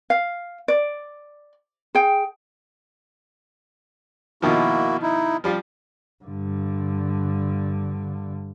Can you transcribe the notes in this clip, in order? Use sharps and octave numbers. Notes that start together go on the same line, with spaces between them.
F5
D5
G#4 G5
B2 D#3 F3 A#3 E4 F#4
D#4 E4
F3 G3 F4
G2 D3